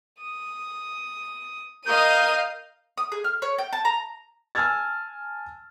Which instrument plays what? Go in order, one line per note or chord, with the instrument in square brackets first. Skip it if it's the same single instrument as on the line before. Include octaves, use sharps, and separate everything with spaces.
[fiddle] D#6
[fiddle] A#4 D#6 [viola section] D#5 [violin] F5 D#7 [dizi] G6
[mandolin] D#6
G#4
F6
C#5
G5
A5
A#5
[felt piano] G#5 A5 E6 F6 G#6 A6